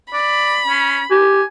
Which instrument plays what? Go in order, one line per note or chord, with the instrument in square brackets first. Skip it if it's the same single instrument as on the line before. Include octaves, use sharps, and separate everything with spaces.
[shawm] D5 [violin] B5
[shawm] C#4
[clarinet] G4 [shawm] G#5